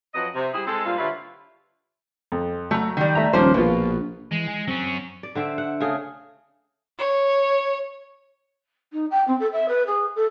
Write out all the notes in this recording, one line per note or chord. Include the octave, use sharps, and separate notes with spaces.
F2 F#3 B4 D#5
C3
G3 E4 G4 G#4
G#3 C4 A4
G2 A#2 F3 G3 F4
D3 G3 E4 F4 B4 C#5
F2
F#3 A3 A#5
D#3 G3
A3 E5 A#5
D#1 F3 A#3 C#4 C5
A#1 B2 B3 F4
E3 G#3
G#5
F#3 C4 C#4
D5
D3 C4 E5
F#5
C#3 A3 G#4
C#5
D#4
G5
C4
A4
E5
B4
G#4
A4